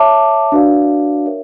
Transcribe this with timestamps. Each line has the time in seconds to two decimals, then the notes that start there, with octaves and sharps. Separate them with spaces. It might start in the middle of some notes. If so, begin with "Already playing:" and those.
Already playing: C#5 E5 A5 D6
0.52 D4 F#4 B4 D5 F5
1.26 A#4 C#5 E5